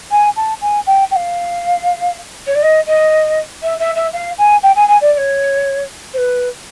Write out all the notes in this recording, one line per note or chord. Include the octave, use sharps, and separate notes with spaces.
G#5
A5
G#5
G5
G5
F5
C#5
D5
D#5
D#5
E5
E5
E5
F5
G#5
G5
G#5
G#5
D5
D5
C#5
C5
B4